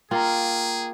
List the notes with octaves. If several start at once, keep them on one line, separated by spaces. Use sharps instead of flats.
A#3 F4 G#4 G5 A#5